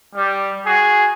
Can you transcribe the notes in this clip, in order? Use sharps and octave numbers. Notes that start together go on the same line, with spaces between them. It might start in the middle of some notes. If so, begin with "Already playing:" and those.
G3
F#4 G#4